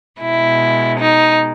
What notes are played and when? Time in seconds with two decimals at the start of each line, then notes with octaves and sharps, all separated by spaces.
0.21 B2 G#3 E4
0.98 D#4